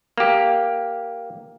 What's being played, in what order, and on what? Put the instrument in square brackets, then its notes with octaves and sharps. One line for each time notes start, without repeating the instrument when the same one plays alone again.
[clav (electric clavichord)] A#3 G4